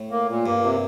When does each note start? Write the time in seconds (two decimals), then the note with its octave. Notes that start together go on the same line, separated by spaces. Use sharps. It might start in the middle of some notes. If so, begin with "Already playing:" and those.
Already playing: A2
0.11 A#3
0.29 A#2
0.46 G2 A#3
0.63 C3